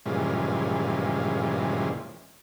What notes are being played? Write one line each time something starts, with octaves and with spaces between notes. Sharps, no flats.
G2 A#2 C#3 E3 F3 G#3